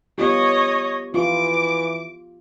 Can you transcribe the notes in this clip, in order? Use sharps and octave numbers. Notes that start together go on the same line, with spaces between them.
B3 F4 G4 C#5 D#5
E3 F4 D6